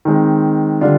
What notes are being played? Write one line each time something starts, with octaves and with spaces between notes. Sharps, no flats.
D#3 G#3 C4
D3 G3 D4 F4